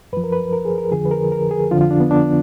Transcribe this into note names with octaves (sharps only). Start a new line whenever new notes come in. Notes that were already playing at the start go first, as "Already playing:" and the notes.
F#2 F3 B4
A#4
B4
A#4
G#4
A#4
F2 D3 F3 G#4
B4
A#4
A#4
G#4
F2 D3 F3 F4
F4
D4
B3
D4